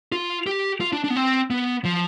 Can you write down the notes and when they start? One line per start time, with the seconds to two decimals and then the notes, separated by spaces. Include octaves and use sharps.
0.12 F4
0.47 G4
0.81 F4
0.93 D4
1.04 D4
1.10 B3
1.16 C4
1.50 B3
1.85 F3